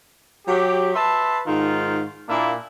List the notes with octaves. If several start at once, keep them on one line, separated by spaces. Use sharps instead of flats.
F#3 G4
B4 E5 A5 C6
G#2 D#3 F4
A#2 A#3 D4 E4